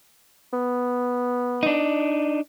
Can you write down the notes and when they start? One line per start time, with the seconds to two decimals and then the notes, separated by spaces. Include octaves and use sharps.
0.53 B3
1.63 D4 D#4